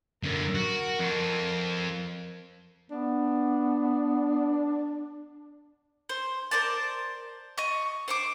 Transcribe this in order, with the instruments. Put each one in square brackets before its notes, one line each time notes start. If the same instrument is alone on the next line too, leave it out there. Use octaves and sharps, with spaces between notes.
[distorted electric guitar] F#2 D3 [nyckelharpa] A#4
[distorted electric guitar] F#4
F2
[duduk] B3 [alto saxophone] D4
[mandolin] C5
A#4 C5 D5 A5
D#5 C#6
C5 C#6 D6